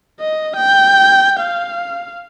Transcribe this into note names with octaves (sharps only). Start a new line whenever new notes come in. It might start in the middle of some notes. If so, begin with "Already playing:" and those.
D#5
G5
F5